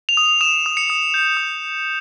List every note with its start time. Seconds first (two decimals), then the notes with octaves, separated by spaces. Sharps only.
0.09 F7
0.17 D#6
0.26 F7
0.41 D#6 E7
0.66 D#6
0.77 C#7
0.90 D#6
1.14 G6
1.37 D#6